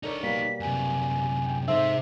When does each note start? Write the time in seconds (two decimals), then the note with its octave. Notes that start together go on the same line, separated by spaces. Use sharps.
0.03 D4 D#4 A4 A#4 C#5
0.23 B2 G3 A#3 B6
0.60 F#2 C3 G#5
1.47 G5
1.68 G#2 C3 C4 A4 C5 E5